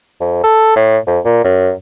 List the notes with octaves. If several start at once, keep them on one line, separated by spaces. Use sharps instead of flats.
F2
A4
A2
F2
A#2
F#2